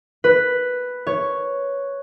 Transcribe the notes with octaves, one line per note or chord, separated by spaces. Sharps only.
B4
C#5